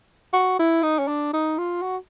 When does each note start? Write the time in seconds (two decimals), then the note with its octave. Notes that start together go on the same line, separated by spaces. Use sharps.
0.33 F#4
0.59 E4
0.83 D#4
0.99 C#4
1.08 D4
1.33 D#4
1.58 F4
1.82 F#4